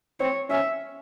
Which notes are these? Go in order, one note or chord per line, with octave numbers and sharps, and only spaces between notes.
C4 C#5
C#4 E5